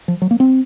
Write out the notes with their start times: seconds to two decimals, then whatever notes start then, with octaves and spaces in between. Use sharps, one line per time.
0.08 F3
0.22 F#3
0.31 A#3
0.40 C4